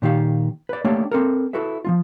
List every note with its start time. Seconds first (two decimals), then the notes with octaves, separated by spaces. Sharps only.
0.02 A#2 D#3 G4 F5
0.69 B4 D5
0.84 A3 A#3 D4 G4 C#5 D5
1.12 C4 A4 A#4
1.53 E4 F#4 A4 B4 E5
1.85 F3 A3 F4